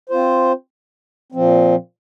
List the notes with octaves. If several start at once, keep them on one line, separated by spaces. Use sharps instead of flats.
C4 F4 C5
A#2 F3 C4